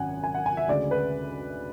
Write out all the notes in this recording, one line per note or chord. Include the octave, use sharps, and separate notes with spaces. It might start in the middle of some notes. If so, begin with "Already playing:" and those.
Already playing: G#1 F#2 F#5 G#5
G#5
F#5
G#5
E5
D2 C#3 G#3 D5
B4